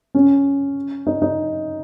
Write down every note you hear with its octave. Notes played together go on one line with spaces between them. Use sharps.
C#4
D#4
D#4